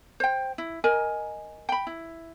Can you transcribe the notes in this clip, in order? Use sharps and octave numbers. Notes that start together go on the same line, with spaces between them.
C5 G5
E4
A#4 D#5 G#5
G5 B5
E4